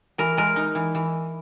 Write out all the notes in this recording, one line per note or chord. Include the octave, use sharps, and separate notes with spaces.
E3 A#4
G#3 A#4
D#4
E3
E3